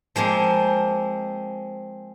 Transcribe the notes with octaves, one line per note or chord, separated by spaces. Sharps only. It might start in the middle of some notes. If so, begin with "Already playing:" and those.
F3 G#3 A#3 C4